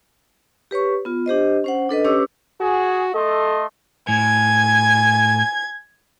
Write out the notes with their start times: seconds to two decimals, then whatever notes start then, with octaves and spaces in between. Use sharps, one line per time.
0.71 G4 B4 C#5 C#6
1.05 B3 F4
1.26 D4 G4 C5 D#5
1.64 C#4 C5 F#5
1.89 D4 A4 B4 D#5
2.05 C#4 G4 B4 C#5 D6 E6
2.61 F#4 G#4
3.15 A3 A4 D#5 C6
4.09 A2 G#5 G#6